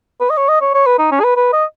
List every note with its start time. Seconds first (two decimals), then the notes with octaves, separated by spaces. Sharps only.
0.20 B4
0.30 D#5
0.37 C#5
0.49 D#5
0.62 C#5
0.74 C#5
0.86 B4
0.99 D#4
1.12 C#4
1.20 G#4
1.24 B4
1.36 B4
1.53 D#5